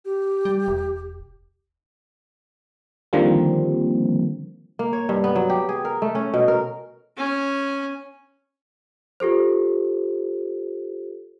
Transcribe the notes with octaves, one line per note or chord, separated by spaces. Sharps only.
G4
G3
E1
D3 D#3 F3 G3 A#3 C4
A#3
C#5
G2
B3
F#3
G4
G#4
A#4
A3
C#4
B2
A#4
C#4 G#5
F4 G4 A4 C5